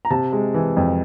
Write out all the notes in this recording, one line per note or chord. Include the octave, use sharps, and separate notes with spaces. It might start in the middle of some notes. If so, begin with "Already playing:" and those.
A#5
C3 A5
G#3
E3
F2